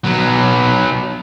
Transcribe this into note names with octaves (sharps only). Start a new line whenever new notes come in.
F#3 B3